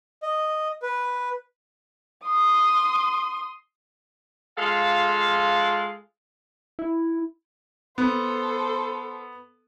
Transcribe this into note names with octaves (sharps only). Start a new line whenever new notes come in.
D#5
B4
C6 D#6
G#3 F4 A4 F5
E4
B3 A4 C5